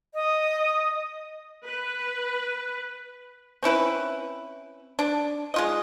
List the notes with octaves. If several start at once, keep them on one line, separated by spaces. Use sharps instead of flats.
D#5
B4
C4 C#4 E4 B4
D4
G#3 F4 D#5